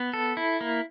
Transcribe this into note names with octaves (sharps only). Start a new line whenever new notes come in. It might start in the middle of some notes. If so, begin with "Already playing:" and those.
Already playing: B3
A4
E4
A#3